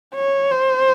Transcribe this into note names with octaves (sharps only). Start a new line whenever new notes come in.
C#5
C5